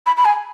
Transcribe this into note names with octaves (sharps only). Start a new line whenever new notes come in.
B5
B5
G#5